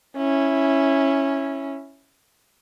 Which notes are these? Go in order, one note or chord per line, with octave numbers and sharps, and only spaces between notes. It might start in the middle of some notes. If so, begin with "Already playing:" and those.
C#4 E4